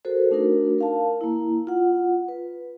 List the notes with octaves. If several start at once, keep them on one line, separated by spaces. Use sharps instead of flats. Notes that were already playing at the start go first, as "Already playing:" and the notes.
F#4 A4 A#4 C5
A3 D4 D#4 F#4 A#4
A#4 F5 A5
A#3 E4
F4 F#5
B4